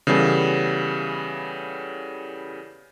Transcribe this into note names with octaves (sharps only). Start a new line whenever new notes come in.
C#3 E3 G3 B3 A4